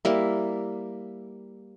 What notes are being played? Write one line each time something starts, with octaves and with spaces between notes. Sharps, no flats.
G3 A#3 E4